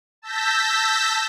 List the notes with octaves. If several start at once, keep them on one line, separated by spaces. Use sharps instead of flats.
A5 E6 G6 A#6 B6